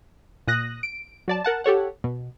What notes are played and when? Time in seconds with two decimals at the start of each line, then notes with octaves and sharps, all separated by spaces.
0.47 A#2 D#6 F#6 A#6
0.83 D7
1.28 F#3 D5 A5
1.44 A#4 F#5 A5
1.64 G4 A4 C#5 F#5
2.04 B2